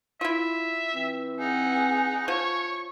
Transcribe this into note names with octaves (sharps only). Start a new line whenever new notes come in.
E4 F4 E5
E3 C4
D#4 G#4 F#5
F3 C#5 C#6